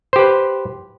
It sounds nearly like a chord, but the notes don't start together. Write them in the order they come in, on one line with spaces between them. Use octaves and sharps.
C5 G4 B4